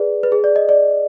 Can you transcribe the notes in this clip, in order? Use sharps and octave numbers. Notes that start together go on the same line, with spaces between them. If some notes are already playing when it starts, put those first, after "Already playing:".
Already playing: G#4 B4 D5
B4
G#4
D5
D#5
D5